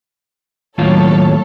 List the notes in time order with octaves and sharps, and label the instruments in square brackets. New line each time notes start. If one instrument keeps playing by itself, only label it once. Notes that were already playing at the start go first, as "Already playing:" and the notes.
[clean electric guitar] D#2 A2 F4 [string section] F#3 A4 C#5